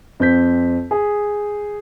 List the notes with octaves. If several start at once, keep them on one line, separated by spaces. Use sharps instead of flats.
F2 C4 G6 B6
G#4